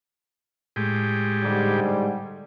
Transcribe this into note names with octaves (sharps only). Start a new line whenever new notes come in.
A2 G#3 G4
G#2 D3 G3